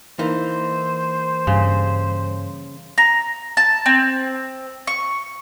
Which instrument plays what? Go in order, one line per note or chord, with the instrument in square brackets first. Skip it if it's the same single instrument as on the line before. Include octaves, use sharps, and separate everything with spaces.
[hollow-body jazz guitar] E3 A#3 D#4 [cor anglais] C5
[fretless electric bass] G2 [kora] C#3
[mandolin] A#5
A5
C4
C#6